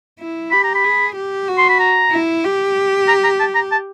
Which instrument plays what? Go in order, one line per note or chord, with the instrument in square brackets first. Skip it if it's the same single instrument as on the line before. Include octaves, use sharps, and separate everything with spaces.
[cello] E4
[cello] G4 [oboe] B5
[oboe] A#5
B5
[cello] G#4
G4
F#4
[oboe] C6
B5
A#5
[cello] E4
G4
[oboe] A#5
A#5
A5
A#5
A5